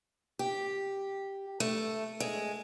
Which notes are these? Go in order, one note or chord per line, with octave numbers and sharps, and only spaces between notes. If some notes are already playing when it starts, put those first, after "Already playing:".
G4
A3
G#3